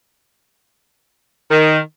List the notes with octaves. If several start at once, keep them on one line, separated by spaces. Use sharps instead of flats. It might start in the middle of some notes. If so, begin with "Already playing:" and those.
D#3